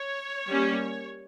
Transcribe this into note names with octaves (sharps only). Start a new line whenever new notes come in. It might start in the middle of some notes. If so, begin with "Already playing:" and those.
Already playing: C#5
G3 A#3 C#4